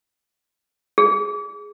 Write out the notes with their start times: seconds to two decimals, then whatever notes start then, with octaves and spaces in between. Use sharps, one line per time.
0.98 G#4